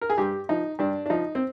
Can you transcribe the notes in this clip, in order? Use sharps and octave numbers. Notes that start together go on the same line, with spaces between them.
A#4
G#4
G2 G4
F3 D#4
G2 D4
D4
F3 D#4
C4